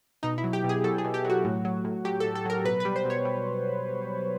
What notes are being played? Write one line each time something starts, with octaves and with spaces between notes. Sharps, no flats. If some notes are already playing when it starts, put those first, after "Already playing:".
B2 D#4
E4
F#3
G4
B2
G#4
F#3 A4
G#4
B2
G4
F#3 F#4
A2
F#3
A2
F#3 G4
A2 A4
A4
F#3 A#4
B2 B4
G3 B4
C5
B2 C#5
G3